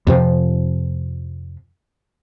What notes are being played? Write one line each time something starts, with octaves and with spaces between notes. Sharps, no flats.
F2 C3 F3